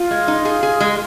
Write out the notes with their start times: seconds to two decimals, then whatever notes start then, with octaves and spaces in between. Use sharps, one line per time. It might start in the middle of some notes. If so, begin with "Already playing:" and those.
Already playing: F4
0.11 G#3
0.28 D#4
0.45 G#4
0.63 G#4
0.80 G#3